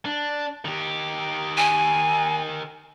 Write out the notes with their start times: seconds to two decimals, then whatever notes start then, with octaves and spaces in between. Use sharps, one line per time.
0.05 D4
0.65 D#3 G4
1.57 G#5